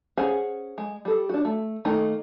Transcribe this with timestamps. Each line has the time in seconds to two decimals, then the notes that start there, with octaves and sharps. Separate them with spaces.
0.17 C#4 G#4 C5 F#5
0.78 G#3
1.05 G3 A4
1.29 D4 F#4
1.45 A3
1.85 D#3 A3 A#3 D#4